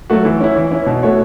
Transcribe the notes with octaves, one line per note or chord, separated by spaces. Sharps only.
F#3 A3 F#4
E3
C#4 E4
E3
C#4 E4
B2
A3 F#4 C#5